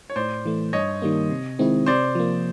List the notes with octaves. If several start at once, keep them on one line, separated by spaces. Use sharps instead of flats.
C#5
A2 C5 D5
E3 A3
G2 C#5 D#5
D#3 G3 A#3
C3
D#3 G#3 C4 E4
C3 C5 D5
F3 A#3